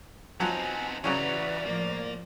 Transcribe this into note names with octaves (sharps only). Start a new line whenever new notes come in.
F3 F#3 B3 C4 D#4 G#5
C#3 E3 F#3 C#4 F#4 B4 D5 A#5
A2 F3 A#3